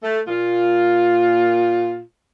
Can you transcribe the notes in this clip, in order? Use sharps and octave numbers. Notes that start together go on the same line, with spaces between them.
A3
A#2 F4